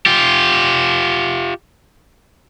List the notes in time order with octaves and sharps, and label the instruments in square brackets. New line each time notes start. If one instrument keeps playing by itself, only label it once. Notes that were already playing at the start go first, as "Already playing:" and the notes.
[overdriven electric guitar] F4 G4